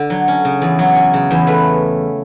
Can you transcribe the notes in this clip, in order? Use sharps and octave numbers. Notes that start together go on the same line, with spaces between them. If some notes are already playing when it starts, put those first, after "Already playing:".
Already playing: D3 D4
F#3
C#4
C#3
E2
F#3
C#4
C#3
E2
A3 B4